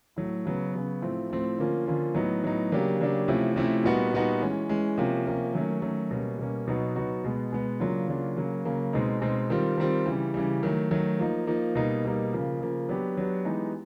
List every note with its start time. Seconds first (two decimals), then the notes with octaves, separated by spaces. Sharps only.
0.16 A2 F#3 A3
0.45 C#3 F#3 B3
0.73 C#3 F#3 B3
1.02 A2 F3 A3 C4
1.30 A2 F3 A3 C4
1.58 D3 F3 A#3 C#4 F4
1.86 D3 F3 A#3 C#4 F4
2.14 A2 F#3 B3 D#4
2.43 A2 F#3 B3 D#4
2.71 C#3 F#3 A#3 D4 G4
3.00 C#3 F#3 A#3 D4 G4
3.28 C3 F3 A3 C#4 E4
3.56 C3 F3 A3 C#4 E4
3.84 A#2 G3 B3 D#4 F#4
4.13 A#2 G3 B3 D#4 F#4
4.41 E3 G#3 C#4
4.69 E3 G#3 C#4
4.98 C3 F3 A#3 C#4
5.26 C3 F3 A#3 C#4
5.54 D#3 F#3 A3 C#4
5.82 D#3 F#3 A3 C#4
6.11 B2 G3 A#3 C#4
6.38 B2 G3 A#3 C#4
6.67 B2 F#3 B3 D#4 F#4
6.96 B2 F#3 B3 D#4 F#4
7.24 B2 G#3 B3
7.52 B2 G#3 B3
7.80 C#3 F#3 A#3 D4 F4
8.08 C#3 F#3 A#3 D4 F4
8.37 C#3 F#3 A#3
8.65 C#3 F#3 A#3
8.93 B2 G#3 C4 D#4
9.21 B2 G#3 C4 D#4
9.50 D#3 G3 C4 F4
9.78 D#3 G3 C4 F4
10.06 C#3 E3 G3
10.34 C#3 E3 G3
10.63 D#3 F#3 A3
10.91 D#3 F#3 A3
11.19 F3 A#3 D#4
11.47 F3 A#3 D#4
11.75 B2 G3 A#3 D#4
12.04 B2 G3 A#3 D#4
12.33 C#3 F3 A#3
12.61 C#3 F3 A#3
12.89 F#3 B3 D4 G4
13.17 F#3 B3 D4 G4
13.45 E3 G#3 B3 D#4 G4